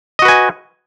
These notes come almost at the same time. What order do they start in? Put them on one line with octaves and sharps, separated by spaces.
D#5 F#4 B4 G#5